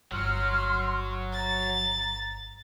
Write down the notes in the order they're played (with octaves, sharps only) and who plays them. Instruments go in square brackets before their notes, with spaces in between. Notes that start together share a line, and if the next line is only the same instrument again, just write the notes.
[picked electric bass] G1 [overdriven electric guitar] F#3 [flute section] C6 F6
[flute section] A#5 [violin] A6